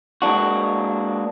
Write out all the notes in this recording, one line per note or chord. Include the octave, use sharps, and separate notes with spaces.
G#3 A#3 D4 F#4